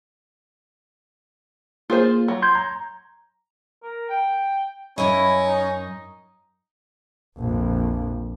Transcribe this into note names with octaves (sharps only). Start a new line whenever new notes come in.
A#3 F4 G#4 C5
F#3
C6 G6 G#6
A#5
A#4
G5
F#2 C#4 E4 D#5
D#4
A#1 F2